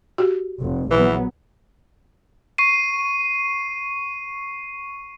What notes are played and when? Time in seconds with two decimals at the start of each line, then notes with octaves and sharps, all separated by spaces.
0.18 F#4 G4
0.62 F1
0.91 A#1 E3 F#3 B3
2.58 C#6 C7 D#7